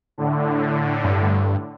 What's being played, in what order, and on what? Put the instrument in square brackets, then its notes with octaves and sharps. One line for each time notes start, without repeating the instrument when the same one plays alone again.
[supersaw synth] A2 D3
[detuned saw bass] G2